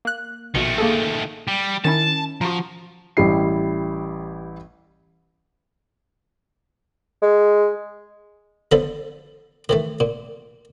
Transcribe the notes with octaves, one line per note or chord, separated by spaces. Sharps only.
A#3 F#6
A#1 B2 D#3 A3 C#7
A#3 G#4 A4
G3
D#3 C#4 E4 A5
F3 F#4 A#5
A1 G3 E4 C7
G#3
D3 F3 B3 A4
D#3 E3 A3
A#2